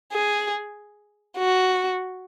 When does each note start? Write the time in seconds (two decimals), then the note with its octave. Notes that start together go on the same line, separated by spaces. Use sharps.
0.13 G#4
1.38 F#4